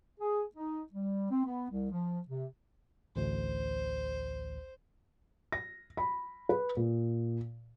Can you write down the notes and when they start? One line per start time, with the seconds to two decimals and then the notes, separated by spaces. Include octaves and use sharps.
0.19 G#4
0.56 D#4
0.93 G3
1.31 C4
1.45 B3
1.70 C2
1.91 F3
2.27 C3
3.16 A1 D2 C5
5.52 A#6
5.97 B5
6.49 B4
6.77 A#2